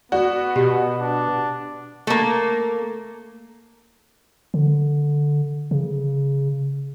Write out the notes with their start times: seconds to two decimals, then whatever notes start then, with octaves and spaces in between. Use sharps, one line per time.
0.12 B3 F#4 D5
0.56 B2 G4
1.01 D4
2.07 A3 A#3
4.54 D3
5.71 C#3